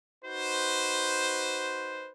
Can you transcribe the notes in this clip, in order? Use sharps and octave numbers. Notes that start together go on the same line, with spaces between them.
D#4 F#4 B4 C5